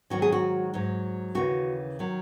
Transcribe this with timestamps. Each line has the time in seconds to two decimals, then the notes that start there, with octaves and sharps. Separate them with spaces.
0.10 G#2 D#3 F#3 F#4
0.22 G#4
0.32 F#4
0.74 G#2 F#3
1.35 D#2 C#3 E3 F#4
1.99 D#3 F#3